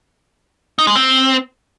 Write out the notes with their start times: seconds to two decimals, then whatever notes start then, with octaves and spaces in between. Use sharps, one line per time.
0.79 D#4
0.87 G#3
0.96 C4